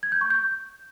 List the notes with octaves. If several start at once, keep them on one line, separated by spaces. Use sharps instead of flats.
G#6
G6
C#6
G6